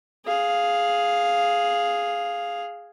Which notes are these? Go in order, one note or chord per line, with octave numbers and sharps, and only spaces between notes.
G#4 F5